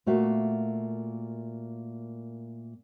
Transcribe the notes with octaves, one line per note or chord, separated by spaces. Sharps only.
A#2 A3 A#3 F#4 E5